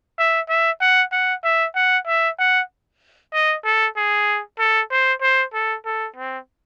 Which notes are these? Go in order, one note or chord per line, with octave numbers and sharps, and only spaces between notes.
E5
E5
F#5
F#5
E5
F#5
E5
F#5
D#5
A4
G#4
A4
C5
C5
A4
A4
C4